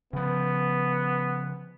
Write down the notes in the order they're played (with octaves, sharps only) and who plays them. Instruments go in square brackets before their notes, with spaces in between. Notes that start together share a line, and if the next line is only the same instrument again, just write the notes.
[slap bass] C#3 F3 [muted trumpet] B3